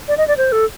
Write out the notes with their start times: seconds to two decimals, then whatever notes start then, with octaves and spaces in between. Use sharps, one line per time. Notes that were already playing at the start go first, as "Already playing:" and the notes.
0.08 D5
0.18 D#5
0.28 D5
0.37 C5
0.52 A4